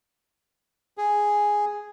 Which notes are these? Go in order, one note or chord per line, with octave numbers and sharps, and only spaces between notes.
G#4